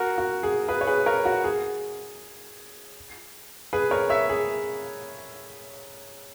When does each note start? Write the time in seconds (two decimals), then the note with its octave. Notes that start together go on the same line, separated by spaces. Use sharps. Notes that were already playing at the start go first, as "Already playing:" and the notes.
Already playing: F#4 A#4
0.18 F#4
0.43 G#4
0.68 G#4 B4
0.81 C#5
0.87 G#4 B4
1.06 A#4 C#5
1.25 F#4
1.44 G#4
3.73 G#4 B4
3.91 A#4 C#5
4.10 C#5 E5
4.29 G#4